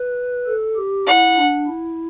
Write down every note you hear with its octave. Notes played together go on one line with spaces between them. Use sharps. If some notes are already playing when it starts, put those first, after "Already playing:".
Already playing: B4
A4
G4
E4 F#5
D4
E4